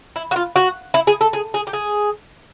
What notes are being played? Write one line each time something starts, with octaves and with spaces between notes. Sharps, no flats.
E4
F#4
F4
F#4
E4
G#4
A4
G#4
G#4
G4
G#4